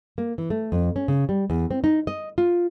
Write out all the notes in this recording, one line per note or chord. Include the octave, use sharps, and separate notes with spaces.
A#3
E3
A3
F2
C#4
C#3
G3
E2
C4
D#4
D#5
F4